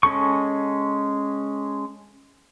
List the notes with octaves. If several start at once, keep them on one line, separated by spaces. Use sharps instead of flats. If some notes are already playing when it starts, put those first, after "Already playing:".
G#3 C#4 A4 C#6